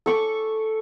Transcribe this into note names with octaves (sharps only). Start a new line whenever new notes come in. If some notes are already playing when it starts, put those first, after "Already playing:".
A4 C#6 D6